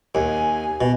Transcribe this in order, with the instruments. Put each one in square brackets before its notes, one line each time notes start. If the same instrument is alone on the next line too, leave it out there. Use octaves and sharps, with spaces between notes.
[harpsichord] D#2 [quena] G#5
[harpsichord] B2